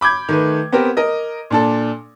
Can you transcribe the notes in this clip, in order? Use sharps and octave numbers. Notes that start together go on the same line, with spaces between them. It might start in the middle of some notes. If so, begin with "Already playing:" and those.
B5 D6 G6 G#6
D#3 A3 B4
B3 C4 G4 A#4
A#4 D#5
A#2 D4 A4